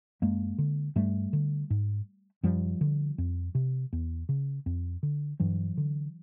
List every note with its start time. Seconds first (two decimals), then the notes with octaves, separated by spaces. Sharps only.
0.22 F#2 G#3 A#3
0.58 D3
0.96 G2 G3 A3
1.33 D3
1.70 G#2
2.43 F#2 F3 G3
2.81 D3
3.18 F2
3.55 C3
3.93 E2
4.29 C#3
4.66 F2
5.03 D3
5.40 G2 E3 F#3
5.77 D3